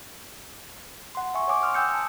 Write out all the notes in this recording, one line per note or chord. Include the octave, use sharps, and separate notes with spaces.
F#5 C6
E5 G#5 C#6
C#5 F#5 G#5 D6 D#6
C6 D#6 F6
G5 G#5 E6 G6 C#7
G#5 A5